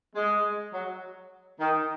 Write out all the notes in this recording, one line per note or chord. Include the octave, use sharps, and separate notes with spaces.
G#3
F#3
D#3